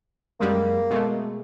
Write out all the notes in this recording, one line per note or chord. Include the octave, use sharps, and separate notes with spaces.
F#2 G3 G#3 A#3
B2 G#3 A3